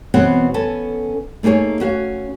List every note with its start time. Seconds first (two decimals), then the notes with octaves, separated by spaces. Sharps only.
0.14 B2 E3 B3 C4 C#5 F#5
0.54 B3 C#4 A4 A5
1.43 A3 A#3 D#4 G#4 C#5
1.80 C#4 F#4 F5